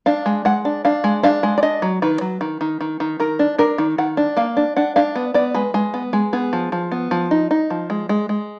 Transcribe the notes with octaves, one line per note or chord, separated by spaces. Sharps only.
D4 F5
G#3
G#3 F#5
D4
D4 F5
G#3
D4 F5
G#3
D5
D4 D#5
F#3
D#3 B4
F#3
D#3
D#3
D#3
D#3
D#3 A#4
D4
D4 A#4
D#3
D#3 F#5
D4
A#3 F5
D4
D4 F#5
D4 F5
B3
B3 D5
G#3 B4
G#3
B3
G#3
B3 G#4
F3
F3
B3
F3
D#4
D#4
F3
G#3
G#3
G#3